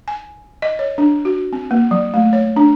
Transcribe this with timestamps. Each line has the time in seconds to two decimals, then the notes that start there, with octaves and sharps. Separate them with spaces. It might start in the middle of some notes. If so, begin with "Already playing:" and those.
0.08 G#5
0.62 D#5
0.79 C#5
0.98 D4
1.25 F#4
1.53 C4
1.71 A#3
1.91 F#3
2.14 A3
2.33 C#5
2.56 D4